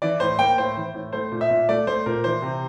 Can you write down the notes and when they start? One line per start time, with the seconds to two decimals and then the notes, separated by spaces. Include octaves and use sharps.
0.02 E3 D5
0.20 A2 C5
0.39 A#3 G5
0.58 A2 C5
0.76 E3
0.94 A2
1.13 A3 C5
1.32 A#2
1.41 E5
1.50 A#2
1.69 A3 D5
1.87 A3 C5
2.06 A#2 A#4
2.24 E3 C5
2.42 C3